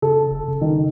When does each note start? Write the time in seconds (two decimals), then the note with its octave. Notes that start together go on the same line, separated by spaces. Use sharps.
0.02 C#3 A4
0.31 F#1
0.48 C#3
0.61 D#3